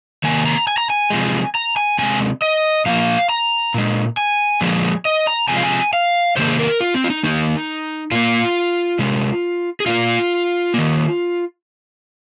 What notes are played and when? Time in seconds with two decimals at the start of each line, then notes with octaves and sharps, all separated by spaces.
0.23 C3 D#3 A#3 G#5
0.46 A#5
0.67 G#5
0.78 A#5
0.90 G#5
1.10 C3 F3 G#3
1.55 A#5
1.77 G#5
1.99 C3 G#3 G#5
2.42 D#5
2.86 A#2 F3 A#3 F5
3.29 A#5
3.74 A#2 G#3
4.17 G#5
4.61 A#2 F3 G#3
5.05 D#5
5.27 A#5
5.48 C3 F3 G#3 G#5
5.56 F5
5.63 G#5
5.93 F5
6.36 C3 D#3 A#3 C5
6.47 G#4
6.59 A#4
6.80 F4
6.94 C4
7.04 F4
7.10 D#4
7.23 D#3 A#3 D#4
8.11 A#2 A#3 F4
8.99 C3 G#3
9.80 G#4
9.86 A#2 A#3 F4
10.74 D#3 A#3